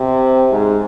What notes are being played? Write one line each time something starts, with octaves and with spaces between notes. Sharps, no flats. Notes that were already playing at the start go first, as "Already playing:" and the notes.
Already playing: C3
G#2